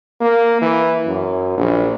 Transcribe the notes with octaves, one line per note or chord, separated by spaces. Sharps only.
A#3
E3
F#2
A#1